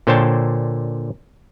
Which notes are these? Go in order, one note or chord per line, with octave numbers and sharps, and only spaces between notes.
A#2 D3 C5 C#5 G5 A5